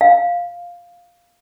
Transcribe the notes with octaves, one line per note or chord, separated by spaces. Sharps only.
F5